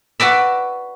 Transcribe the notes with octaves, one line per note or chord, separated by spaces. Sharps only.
F#4 B4 D5 E5